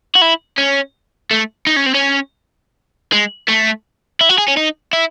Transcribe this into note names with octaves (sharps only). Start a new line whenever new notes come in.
F#4
E4
C#4
A3
D#4
C#4
C4
C#4
G#3
A3
E4
F#4
G#4
C#4
D#4
E4